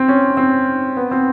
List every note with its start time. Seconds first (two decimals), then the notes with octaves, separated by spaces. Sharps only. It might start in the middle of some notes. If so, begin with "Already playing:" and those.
Already playing: C4
0.09 C#4
0.37 C4
0.97 B3
1.11 C4